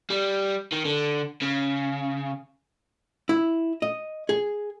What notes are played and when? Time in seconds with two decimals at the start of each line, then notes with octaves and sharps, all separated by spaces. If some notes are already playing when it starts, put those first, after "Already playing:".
0.10 G3
0.72 D#3
0.85 D3
1.42 C#3
3.29 E4
3.82 D#5
4.29 G#4